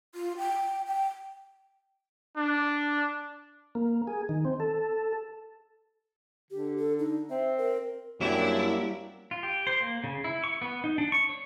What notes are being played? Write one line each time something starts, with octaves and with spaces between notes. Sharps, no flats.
F4
G5
G5
D4
A#3
G#4
D#3
C4
A4
D3 G4
A4
D#4
C4 E5
A#4
F#2 G3 A#3 C4 D4 E4 G4
F4
G4
C5
A#3
C#3
E4
C#6
B3
D#4
D4
C#6
C#5